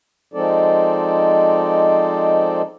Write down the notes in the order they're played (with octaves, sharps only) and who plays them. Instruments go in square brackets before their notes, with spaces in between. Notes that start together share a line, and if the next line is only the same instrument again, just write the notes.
[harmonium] F3 G#3 C4 D#4 A4 D5